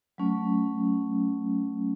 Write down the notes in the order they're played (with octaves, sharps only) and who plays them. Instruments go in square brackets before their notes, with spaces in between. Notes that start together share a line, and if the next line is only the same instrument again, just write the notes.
[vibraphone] F#3 A3 C#4